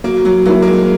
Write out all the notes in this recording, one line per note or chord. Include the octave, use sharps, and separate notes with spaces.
F#3 A#3
F#3
F#3 A#3 E4
A#3
G#3